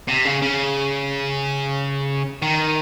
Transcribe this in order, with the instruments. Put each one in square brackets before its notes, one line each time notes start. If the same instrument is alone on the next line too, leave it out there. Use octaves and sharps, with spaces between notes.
[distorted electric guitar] C3
C#3
C#3
D#3